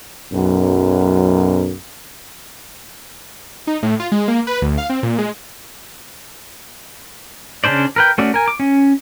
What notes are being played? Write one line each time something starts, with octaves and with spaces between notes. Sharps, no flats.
B1 F#2
D#4
A2
F4
G#3
A#3
B4
D2
F5
C4
A#2
G#3
C#3 C#4 D4 C5 D5
A#4 B4 G5
A3 C#4 F#4 D5
A#4 G#5
D6
C#4